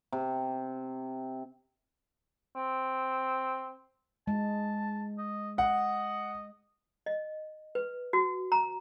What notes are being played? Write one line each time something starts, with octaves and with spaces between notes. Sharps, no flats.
C3
C4
G#3 A5
D#5
D#5 F#5
D#5
B4
F#4
A#5